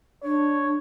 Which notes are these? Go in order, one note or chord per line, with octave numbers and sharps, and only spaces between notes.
D4 C#5